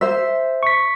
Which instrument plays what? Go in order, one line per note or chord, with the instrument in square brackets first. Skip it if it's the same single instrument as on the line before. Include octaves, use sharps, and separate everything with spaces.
[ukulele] C5 E5
[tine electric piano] C#6 B6